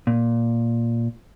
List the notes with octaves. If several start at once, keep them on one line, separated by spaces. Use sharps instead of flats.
A#2